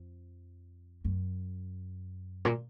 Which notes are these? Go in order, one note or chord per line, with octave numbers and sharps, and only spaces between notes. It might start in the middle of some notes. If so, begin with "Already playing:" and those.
Already playing: F2
F#2
A#2